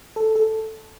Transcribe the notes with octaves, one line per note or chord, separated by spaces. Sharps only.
A4
A4